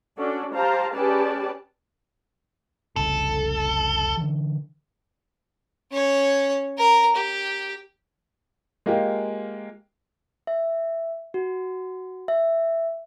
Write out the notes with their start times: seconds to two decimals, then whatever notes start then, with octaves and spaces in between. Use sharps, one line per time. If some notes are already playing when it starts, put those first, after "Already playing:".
0.18 C#4 D4 F#4 A4 D5
0.54 G4 C5 F5 A5 A#5
0.95 C#4 G4 G#4 B4 D5 A5
2.96 F1 C2 C#3 A4
4.17 D3 E3
5.92 C#4 C#5
6.78 A#4 A#5
7.16 G4
8.86 G#3 A#3 F4 G4
10.47 E5
11.34 F#4
12.28 E5